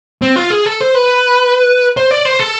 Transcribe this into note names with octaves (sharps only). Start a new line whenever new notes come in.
C4
F4
G#4
A4
C5
B4
C5
D5
C5
A4